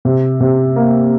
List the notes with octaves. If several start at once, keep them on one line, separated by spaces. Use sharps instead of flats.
C3
C3
A#3